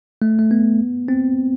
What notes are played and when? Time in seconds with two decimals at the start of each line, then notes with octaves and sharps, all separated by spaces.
0.22 A3
0.39 A3
0.51 B3
1.08 C4